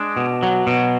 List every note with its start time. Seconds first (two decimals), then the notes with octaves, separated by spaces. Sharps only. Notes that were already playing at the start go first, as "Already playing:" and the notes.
Already playing: G#3 D4
0.16 B2
0.43 F#3
0.67 B2